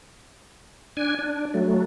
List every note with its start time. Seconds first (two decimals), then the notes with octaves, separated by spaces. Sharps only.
0.97 D4 G#5
1.19 D4
1.54 F#3 A3